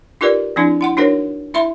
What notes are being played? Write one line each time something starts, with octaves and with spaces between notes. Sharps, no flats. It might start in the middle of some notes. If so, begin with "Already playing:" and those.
D#4 F4 G4 A#4 B4 D5
F3 C4 D4 E4
E4 F#5 C6
D4 D#4 F#4 A#4 C5 C#5
E4 E5 B5 C6